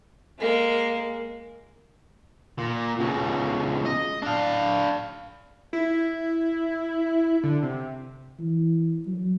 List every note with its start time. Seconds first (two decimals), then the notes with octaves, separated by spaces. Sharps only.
0.39 G#3 A#3
2.58 A#2
2.99 C#2 B2
3.86 D#5
4.22 D4 F5
5.73 E4
7.43 D3
7.63 C3
8.39 E3
9.07 F#3